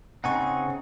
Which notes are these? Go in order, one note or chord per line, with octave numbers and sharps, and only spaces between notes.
C#3 C4 D#4 F#5 G#5 C#6